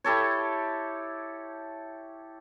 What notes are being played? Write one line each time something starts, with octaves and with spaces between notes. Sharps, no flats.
E4 G4 A4 C#5